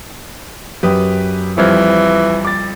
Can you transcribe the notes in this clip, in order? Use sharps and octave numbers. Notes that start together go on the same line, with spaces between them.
F#2 G4 B4 G5 D#6
F2 E3 F3 G3 C5 F6 G#6
D6 A6